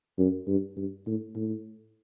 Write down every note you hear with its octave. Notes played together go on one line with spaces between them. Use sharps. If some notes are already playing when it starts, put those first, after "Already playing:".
F#2
G2
G2
A2
A2